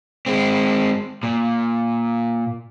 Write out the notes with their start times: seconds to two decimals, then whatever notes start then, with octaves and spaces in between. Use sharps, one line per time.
0.26 G#3 C4
1.23 A#2